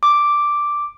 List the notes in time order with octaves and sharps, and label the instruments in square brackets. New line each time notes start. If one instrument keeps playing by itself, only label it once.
[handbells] D6